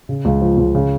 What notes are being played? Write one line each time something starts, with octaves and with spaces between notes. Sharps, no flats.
C#3
C#2
F3
C#2
C#3